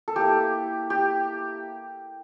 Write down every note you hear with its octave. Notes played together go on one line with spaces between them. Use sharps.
A4
A#3 E4 G4
G4